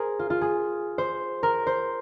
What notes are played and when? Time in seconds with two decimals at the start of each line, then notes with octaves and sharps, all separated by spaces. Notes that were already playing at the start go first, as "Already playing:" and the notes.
Already playing: G#4 A#4 C5
0.19 F4
0.30 F4
0.42 G#4
0.98 C5
1.43 A#4
1.67 C5